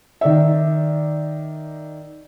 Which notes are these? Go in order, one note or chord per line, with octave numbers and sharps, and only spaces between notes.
D#3 D5 E5